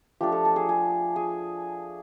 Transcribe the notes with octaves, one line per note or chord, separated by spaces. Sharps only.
F3 A3 D4 G4
A4
A4
G#4
G#4
G#4